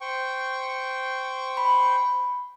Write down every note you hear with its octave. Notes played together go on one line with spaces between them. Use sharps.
C5 G5 C#6
B5